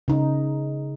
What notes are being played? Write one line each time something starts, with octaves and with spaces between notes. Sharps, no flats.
C#3 D#4